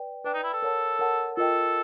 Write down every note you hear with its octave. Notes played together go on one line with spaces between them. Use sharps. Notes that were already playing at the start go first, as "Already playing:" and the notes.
Already playing: B4 D5 G5
D4 B4 D5 G5
D#4
E4
A4
A#4 C#5 F#5 A5
A#4 C#5 F#5 A5
F4 A4 A#4 D#5 G5